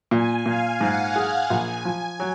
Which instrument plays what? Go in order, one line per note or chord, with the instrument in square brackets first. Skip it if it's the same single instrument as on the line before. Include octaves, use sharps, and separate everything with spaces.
[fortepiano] A#2 [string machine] G#5
[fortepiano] A#2 [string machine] F5
[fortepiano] G#2 [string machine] F#5
[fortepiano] G#4
[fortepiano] A#1 [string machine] G#5
[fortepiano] F3
F#3